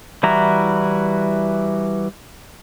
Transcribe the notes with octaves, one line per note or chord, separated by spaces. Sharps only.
E3 G3 E4 F#4 A#5